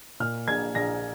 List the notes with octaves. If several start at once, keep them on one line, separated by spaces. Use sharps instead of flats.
A#2 F6
A#1 G#6
A#1 A#6